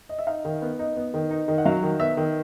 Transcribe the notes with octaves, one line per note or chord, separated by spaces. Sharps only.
D#5
E5
D#4 F5
D#3
B3
D#4
B3
D#3
D#4
D#3
F#5
F#3 F5
D#3
B3 E5
D#3